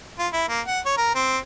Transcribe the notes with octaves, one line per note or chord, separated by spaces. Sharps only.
F4
E4
A#3
F#5
C#5
A#4
C4